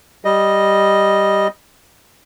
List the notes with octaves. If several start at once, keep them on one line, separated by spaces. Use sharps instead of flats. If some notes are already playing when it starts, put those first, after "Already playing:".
G3 D#5